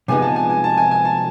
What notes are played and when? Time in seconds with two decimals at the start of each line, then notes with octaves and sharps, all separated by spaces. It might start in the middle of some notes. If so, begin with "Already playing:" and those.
0.08 C3 F3 G#3 B3 D#4 G#5
0.22 A5
0.36 G#5
0.50 G#5
0.64 A5
0.77 G#5
0.91 G#5
1.05 A5